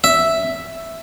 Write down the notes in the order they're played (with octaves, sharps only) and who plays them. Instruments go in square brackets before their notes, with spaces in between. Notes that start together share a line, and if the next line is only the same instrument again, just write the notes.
[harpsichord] E5